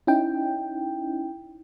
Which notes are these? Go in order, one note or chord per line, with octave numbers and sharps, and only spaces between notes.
C#4 D#4 E4 G5